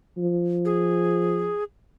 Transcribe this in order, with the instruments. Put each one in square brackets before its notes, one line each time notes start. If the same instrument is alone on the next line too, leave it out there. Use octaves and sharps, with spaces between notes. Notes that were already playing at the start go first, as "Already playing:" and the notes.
[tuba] F3
[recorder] G#4